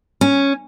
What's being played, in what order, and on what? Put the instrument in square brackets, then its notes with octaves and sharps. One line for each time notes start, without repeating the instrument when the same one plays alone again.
[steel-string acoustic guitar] C#4